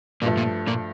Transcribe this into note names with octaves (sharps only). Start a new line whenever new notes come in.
G2 A#2 F3 A3 A#3
A#2 A#3
A#2 A#3